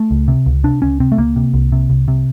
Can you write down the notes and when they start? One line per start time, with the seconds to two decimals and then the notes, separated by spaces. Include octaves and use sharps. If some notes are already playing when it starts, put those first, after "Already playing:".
Already playing: A3
0.11 C#2
0.28 C3
0.46 C#2
0.64 C3 D4
0.82 C#2 C#4
1.00 C3 C4
1.12 A3
1.18 C#2 A#3
1.36 C3
1.54 C2
1.72 C3
1.90 C2
2.08 C3